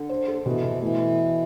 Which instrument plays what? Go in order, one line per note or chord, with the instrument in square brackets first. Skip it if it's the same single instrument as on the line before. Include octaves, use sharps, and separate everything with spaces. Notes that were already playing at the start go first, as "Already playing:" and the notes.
Already playing: [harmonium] D3
[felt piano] C5
A4
[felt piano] B2 [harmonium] E3
[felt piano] B2
[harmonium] E3 [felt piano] A3